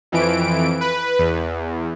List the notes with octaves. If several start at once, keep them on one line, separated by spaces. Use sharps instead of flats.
F2 E3 D7
B4
E2